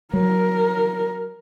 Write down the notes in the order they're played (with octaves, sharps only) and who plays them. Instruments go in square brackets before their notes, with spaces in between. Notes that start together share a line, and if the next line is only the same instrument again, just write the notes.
[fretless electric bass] F#3 [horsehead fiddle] A#4